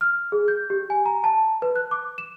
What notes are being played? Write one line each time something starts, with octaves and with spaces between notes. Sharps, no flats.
F6
G#4
G6
G4
G#5
A#5
A5
B4
F#6
D6
E7